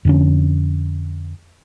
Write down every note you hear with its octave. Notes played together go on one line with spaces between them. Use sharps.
F2 D3 C#4